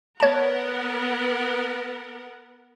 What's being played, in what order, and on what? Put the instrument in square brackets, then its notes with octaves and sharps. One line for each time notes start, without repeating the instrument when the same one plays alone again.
[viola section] B3 A#4 F#5 [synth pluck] C#5 A5